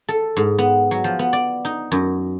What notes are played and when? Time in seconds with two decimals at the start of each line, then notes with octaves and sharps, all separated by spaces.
0.09 A4
0.37 G#2
0.58 B3
0.91 F#3
1.04 F3
1.19 B3
1.33 D5
1.65 D#4
1.92 F#2